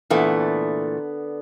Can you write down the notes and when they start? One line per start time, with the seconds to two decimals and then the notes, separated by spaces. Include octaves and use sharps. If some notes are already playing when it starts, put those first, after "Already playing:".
0.10 A#2 D3 E3 A3 B3